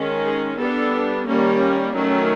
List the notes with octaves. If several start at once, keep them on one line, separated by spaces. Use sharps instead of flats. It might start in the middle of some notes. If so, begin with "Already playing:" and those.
Already playing: D#3 G#3 C#4
G#4
G3 B3 D4 A4
D#3 G3 A#3 C#4
D#3 F#3 A3 C#4